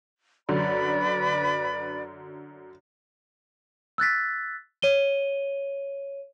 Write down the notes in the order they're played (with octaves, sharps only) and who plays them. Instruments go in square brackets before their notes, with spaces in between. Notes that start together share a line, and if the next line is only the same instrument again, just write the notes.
[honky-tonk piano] F#2 D3 [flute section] B4 D5 B5
[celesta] E6 F#6 A6 B6
C#5 D#7 G7